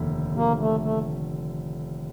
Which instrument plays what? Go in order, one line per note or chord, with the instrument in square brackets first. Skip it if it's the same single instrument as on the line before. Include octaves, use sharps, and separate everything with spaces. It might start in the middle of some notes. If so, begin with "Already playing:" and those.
Already playing: [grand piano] F1 D#2 D3
[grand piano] F1 D#2 D3 [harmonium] A#3
[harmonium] A3
A3